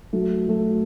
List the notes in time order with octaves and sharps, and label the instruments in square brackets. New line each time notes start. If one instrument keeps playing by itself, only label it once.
[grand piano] F#3 A3
F#3 A3